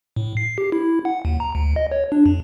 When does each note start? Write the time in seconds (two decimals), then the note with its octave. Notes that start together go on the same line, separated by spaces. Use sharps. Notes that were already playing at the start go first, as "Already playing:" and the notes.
0.16 A2
0.37 C7
0.58 G4
0.72 E4
1.05 F#5
1.25 D#2
1.40 A#5
1.55 D2
1.76 D#5
1.91 C#5
2.12 D4
2.26 F2